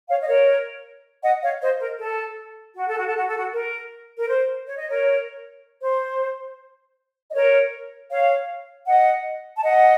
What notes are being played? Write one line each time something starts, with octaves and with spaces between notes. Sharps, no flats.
C#5 F5
D#5
A#4 C#5
D#5 F#5
C#5 F5
C5 D#5
A#4
A4
F#4
A4
F#4
A4
F#4
A4
F#4
A#4
A#4
C5
C#5
D#5
A#4 C#5
C5
D#5
A#4 C#5
C#5 F5
D#5 F#5
A5
D#5 F#5